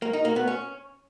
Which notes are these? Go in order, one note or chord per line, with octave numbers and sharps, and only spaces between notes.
A#3
D#4
A#3
B3
C#4